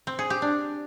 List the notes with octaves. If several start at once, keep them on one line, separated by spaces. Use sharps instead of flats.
C4
G#4
G4
D4